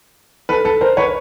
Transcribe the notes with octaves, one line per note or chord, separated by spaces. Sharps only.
A4 B4
A4 B4
A#4 C5
B4 C#5